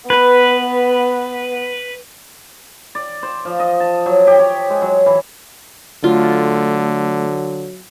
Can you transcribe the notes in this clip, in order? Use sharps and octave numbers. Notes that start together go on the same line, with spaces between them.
B3 B4
D5
C5
F3
D#5
A5
F#3
G4
C#5
G#3
F#3
E3
D3 F#3 A3 F4